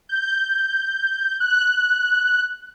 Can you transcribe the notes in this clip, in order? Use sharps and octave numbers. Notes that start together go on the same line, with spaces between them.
G6
F#6